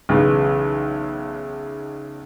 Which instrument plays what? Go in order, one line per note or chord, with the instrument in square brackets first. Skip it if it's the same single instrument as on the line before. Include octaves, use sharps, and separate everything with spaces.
[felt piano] B1 C#3 E3 G#3